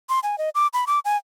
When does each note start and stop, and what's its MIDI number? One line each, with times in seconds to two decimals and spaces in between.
0.09 0.20 84
0.23 0.38 80
0.38 0.50 75
0.55 0.67 86
0.73 0.85 83
0.87 0.99 86
1.05 1.17 80